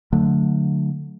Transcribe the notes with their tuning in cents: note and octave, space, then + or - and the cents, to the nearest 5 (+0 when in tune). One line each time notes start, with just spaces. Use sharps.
D3 +0 F#3 -25 A3 +0